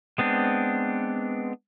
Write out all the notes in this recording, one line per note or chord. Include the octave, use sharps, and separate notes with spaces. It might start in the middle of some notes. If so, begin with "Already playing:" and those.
G#3 B3 C4 D4